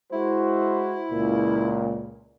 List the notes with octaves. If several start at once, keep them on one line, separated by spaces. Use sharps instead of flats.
G#3 E4 F#4 C5
C#2 A#2